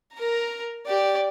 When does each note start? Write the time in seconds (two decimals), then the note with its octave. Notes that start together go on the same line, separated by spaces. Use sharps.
0.14 A#4 A#5
0.87 G4 D5